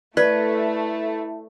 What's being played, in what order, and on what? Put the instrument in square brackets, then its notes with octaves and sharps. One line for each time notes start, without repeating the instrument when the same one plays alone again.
[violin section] A3 [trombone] E4 [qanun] B4 [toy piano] D5